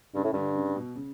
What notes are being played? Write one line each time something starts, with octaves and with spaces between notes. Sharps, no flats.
G2 C#3
A2
G2 D3
C#3
B2
C#3